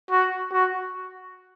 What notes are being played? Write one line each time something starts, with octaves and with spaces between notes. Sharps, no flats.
F#4
F#4